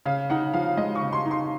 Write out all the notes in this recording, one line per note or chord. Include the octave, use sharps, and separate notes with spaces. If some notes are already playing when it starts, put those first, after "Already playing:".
C#3 F5
D#4 F#5
F3 F5
G#3 D#5
C#6
C#3
C6
D#4
C6